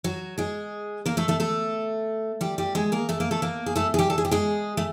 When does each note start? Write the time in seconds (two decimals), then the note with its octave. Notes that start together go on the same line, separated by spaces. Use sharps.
0.04 F#3 F#4
0.38 G#3 G#4
1.06 A#3 A#4
1.17 A3 A4
1.28 A3 A4
1.40 A3 A4
2.41 G3 G4
2.58 G3 G4
2.75 G#3 G#4
2.92 A#3 A#4
3.09 A3 A4
3.20 A#3 A#4
3.31 A3 A4
3.42 A#3 A#4
3.66 G#4
3.76 A3 A4
3.94 G#4
3.99 G3 G4
4.10 A4
4.18 G#4
4.25 G4
4.31 G#3 G#4
4.77 A3